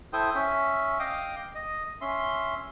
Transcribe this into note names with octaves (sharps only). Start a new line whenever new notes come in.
E4 A4 C5 G5 D#6
C#4 E5
D#5 F5 G5 D6 D#6
D#5
C#4 E5 C6